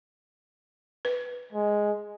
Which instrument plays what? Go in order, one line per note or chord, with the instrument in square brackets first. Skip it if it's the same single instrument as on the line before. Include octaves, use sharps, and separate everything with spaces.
[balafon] B4
[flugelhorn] G#3